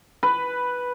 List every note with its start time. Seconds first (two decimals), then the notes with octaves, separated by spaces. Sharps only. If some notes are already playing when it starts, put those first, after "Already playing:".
0.23 B4